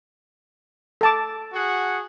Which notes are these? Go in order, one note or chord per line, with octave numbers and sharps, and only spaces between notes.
A4 A5 D6
F#4 G#4 F#5